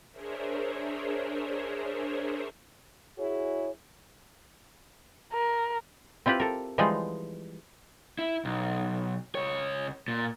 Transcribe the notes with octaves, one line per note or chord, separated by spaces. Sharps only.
D4 G#4 A#4 C5 C#5 E5
E4 F#4 G#4 C#5
A#4
C4 E4 F4 G4 B4
A4 A#4
E3 F3 G3 G#3 D#4 F4
E4
B1
C#2 C#5
A#2